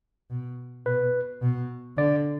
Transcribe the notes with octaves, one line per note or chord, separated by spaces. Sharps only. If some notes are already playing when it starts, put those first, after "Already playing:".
B2
B2 B4
B2
D3 D5